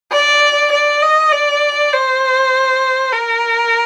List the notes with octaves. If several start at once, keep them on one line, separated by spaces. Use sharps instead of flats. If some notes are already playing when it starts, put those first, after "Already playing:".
D5
D5
D#5
D5
C5
A#4